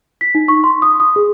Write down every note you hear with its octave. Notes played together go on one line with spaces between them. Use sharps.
B6
D#4
C#6
C6
D#6
D#6
G#4